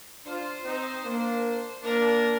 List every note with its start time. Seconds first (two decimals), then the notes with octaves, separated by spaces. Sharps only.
0.26 D4 F4 C5
0.65 C4 D#4
1.05 A#3 D4
1.83 A#3 D4 A#4